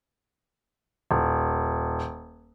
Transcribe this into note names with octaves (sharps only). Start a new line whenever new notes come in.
D#1